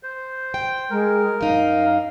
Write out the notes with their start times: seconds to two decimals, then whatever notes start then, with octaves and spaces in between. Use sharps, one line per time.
0.03 C5
0.54 G5
0.90 G#3 A#4
1.41 F#2 D#4 F5